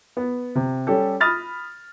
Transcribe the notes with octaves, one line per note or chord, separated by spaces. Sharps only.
B3
C3
G3 C#4 G4 A4
B5 D#6 F6 A6 A#6